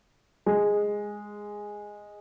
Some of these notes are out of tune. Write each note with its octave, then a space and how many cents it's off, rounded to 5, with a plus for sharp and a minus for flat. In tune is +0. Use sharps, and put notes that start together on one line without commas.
G#3 -5